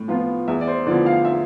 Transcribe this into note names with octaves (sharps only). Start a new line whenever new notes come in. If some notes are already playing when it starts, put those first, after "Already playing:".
Already playing: A2
F3 B3 F4
E2 E5
D5
C5
D3 F3 B3 E4 D5
F5
E5